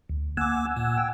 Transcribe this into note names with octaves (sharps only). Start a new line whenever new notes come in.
D2
A#3 F#5 G#5 D6 E6
A#2
G5